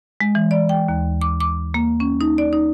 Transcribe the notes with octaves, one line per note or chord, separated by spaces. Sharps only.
G#3
E3
D5
G5
D#2
D6
D6
A#3
C#4
D#4
D5
D#4